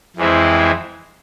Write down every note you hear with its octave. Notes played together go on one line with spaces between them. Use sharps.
F2 E3 G#3 C4 E4